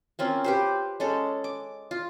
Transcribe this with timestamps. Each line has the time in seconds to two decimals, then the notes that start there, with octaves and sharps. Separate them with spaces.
0.19 A#3 C4 C#4 F4
0.44 G4 B4 C5
1.00 G#3 C#4 A4
1.44 D6
1.91 F4